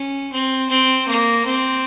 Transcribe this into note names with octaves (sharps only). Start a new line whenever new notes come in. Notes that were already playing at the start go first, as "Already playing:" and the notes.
Already playing: C#4
C4
C4
A#3
C4